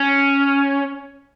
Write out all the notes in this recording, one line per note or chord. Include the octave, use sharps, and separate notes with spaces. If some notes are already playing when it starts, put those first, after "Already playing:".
Already playing: C#4